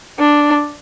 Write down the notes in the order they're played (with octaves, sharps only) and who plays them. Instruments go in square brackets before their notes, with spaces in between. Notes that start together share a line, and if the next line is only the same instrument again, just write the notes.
[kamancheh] D4